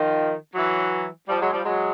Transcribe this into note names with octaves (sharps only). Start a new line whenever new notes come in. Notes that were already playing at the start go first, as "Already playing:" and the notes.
Already playing: D#3 F3
E3 F#3
F3 G3
F#3 G#3
F3 G3
F#3 G#3